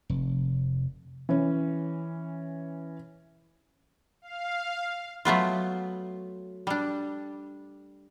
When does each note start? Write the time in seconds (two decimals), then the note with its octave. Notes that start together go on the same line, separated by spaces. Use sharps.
0.10 F1
1.29 E3 C#4
4.22 F5
5.25 F#3 A3 B3 F4
6.67 G3 D4